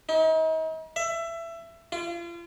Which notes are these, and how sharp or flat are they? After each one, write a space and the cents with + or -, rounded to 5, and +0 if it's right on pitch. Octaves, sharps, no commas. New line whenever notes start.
D#4 +40
E5 +20
F4 -35